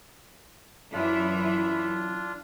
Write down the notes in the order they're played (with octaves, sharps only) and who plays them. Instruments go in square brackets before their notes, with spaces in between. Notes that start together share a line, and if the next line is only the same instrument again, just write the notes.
[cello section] F#2 E3 E5 [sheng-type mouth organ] D4 F4